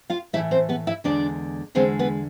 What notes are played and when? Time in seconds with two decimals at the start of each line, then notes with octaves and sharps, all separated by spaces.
0.10 F4 F5
0.33 A2 E3 A3 E4 E5
0.51 C4 C5
0.69 B3 B4
0.87 E4 E5
1.04 E2 D3 G#3 D4 D5
1.75 E2 D3 G#3 C4 C5
1.99 B3 B4